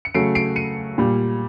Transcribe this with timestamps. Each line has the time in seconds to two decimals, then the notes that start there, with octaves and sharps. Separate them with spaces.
0.05 C#7
0.14 C#3 F#3 A3 C7 D7
0.35 C7 D7
0.56 C#7 D#7
0.98 A#2 G3